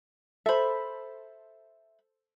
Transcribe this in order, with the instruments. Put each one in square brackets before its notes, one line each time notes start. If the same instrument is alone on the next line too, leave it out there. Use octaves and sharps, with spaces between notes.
[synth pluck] A4 C5 [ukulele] E5 B5